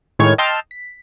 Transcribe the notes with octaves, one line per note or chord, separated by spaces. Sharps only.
A2 D#3 G#3 C#5 F6 G#6
D#5 G5 A5 C6 E6 F6
B6